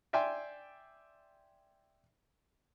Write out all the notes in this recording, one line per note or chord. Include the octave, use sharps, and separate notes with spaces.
D5 E5 G5 G#5 C6